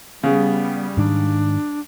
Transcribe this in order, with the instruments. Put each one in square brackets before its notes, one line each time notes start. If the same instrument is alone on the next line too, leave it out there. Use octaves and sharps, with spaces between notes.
[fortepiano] C#3 [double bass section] G3 [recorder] B3
[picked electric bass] G#2 D#3 [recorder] D4